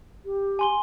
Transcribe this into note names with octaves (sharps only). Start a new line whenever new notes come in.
G4
G#5 C6 G7